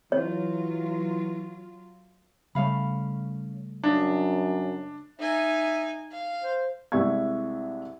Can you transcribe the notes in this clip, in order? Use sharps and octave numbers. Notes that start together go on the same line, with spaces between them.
E3 F#3 F4 C#5
C#3 G3 A3 C#4 F5 B5
F#2 D4 D#5 F5
D#4 E5 G#5
F5
C5
C2 C3 G#3 E5 C#6 G#6